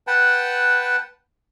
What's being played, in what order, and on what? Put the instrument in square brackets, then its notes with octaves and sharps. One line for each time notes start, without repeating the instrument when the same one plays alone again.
[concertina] B4 F#5 G5 A5